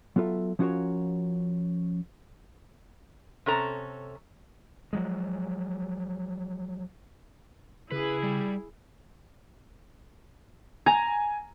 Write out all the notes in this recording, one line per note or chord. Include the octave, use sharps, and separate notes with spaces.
F#3 B3 F4 A4 E5
F3 C#4 F4 F#4 A#4 C#5
C3 C#4 A4 A#5
F3 F#3 G#3
C#3 E4 G#4 B4
G3
G#5 A#5